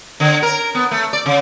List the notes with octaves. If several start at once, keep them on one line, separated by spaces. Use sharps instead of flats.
D3
A#4
B3
A3
D5
C#3